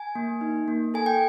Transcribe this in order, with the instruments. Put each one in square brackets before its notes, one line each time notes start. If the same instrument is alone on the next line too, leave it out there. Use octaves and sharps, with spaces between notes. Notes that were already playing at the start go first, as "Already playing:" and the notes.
Already playing: [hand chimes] G#5
A#3
D#4
A#3
A4 G#5
G5